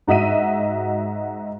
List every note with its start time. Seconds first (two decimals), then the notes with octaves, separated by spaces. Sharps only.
0.07 G#2 F#4 D#5 E5 D#7